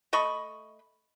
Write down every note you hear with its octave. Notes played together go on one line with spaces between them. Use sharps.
A3 D#5 B5 C#6